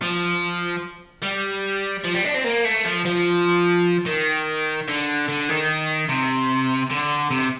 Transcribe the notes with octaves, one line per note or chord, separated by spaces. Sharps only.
F3
G3
F3
G3
D4
C4
A#3
A3
F3
F3
D#3
D3
D3
D#3
C3
D3
C3